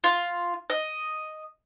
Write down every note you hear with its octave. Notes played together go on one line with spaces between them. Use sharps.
F4
D#5